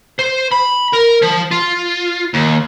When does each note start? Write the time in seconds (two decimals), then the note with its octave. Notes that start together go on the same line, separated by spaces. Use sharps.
0.19 C5
0.52 B5
0.93 A#4
1.22 F3
1.51 F4
2.34 D#2